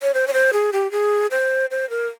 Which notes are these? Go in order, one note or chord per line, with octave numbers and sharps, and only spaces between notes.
C#5
C5
C#5
C5
G#4
G4
G#4
C5
C5
A#4